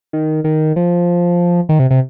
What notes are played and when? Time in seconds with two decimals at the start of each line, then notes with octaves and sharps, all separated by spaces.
0.13 D#3
0.44 D#3
0.76 F3
1.69 D#3
1.79 C3
1.91 C3